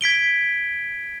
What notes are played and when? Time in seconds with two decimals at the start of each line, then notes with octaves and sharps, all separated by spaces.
0.01 G#6 B6 D7 G7